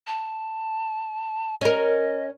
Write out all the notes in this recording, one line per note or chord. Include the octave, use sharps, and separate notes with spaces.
A5
C#4 A#4 D#5